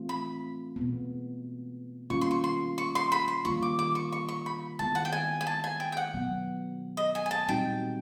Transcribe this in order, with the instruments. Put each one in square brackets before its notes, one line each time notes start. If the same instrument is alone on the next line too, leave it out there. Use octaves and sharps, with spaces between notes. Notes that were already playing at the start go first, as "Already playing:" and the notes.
Already playing: [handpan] E3 A3 C4 F4
[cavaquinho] B5
[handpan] B2 G#3 B3
[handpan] D#3 G3 A#3 C#4 F4 [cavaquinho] C#6
[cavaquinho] C6
C#6
C6
C#6
C6
B5
C6
[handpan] D#3 G3 A#3 D4 F4 [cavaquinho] C#6
[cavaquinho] D6
D6
C#6
C#6
C#6
B5
[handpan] D#3 G#3 B3 E4 [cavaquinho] A5
[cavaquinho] F#5
G5
G#5
G#5
A5
G#5
G5
G5
F#5
[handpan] B2 F#3 B3
[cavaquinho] D#5
G#5
G#5
A5
[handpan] A#2 G3 C4 D#4 F#4 [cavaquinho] G5